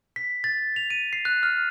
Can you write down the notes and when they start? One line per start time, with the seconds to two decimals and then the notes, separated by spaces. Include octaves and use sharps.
0.16 B6
0.44 A6
0.76 F7
0.90 D#7
1.13 C7
1.25 F#6
1.43 F6